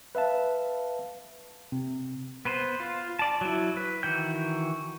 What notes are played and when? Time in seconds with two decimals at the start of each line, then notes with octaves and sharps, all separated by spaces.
0.15 B4 E5 F5 A5
1.72 C3
2.45 B3 B4 C5
2.80 F4
3.19 D5 A5
3.41 F#3 E4
3.77 B4
4.03 D#3 E3 F#4 G5 G6